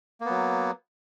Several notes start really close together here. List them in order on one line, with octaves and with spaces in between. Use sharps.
A#3 B3 F#3